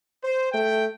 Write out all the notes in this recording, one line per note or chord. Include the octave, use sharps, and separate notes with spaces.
C5
A3 G5